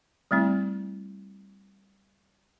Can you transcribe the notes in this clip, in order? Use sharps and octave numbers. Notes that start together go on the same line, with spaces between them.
G3 A3 C4 E4